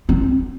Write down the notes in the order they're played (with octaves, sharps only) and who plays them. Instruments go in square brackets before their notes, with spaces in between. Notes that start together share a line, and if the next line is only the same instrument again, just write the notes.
[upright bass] C4